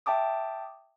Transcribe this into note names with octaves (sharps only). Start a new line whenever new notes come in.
E5 G5 A5 D6 D#6